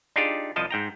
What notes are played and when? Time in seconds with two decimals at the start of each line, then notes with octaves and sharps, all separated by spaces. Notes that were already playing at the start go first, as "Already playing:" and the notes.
0.16 D4 D#4 F4 G4 G#4
0.56 C2 F3 D#5 A5
0.71 G#2 G5 A#5